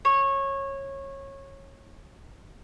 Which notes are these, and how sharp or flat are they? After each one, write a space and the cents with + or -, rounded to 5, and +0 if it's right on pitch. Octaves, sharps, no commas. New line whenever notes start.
C#5 -20